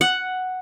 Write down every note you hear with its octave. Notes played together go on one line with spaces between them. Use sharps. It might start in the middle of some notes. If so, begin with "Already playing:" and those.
F#5